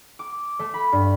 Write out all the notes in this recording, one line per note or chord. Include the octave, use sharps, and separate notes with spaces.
D6
A3
B5
G2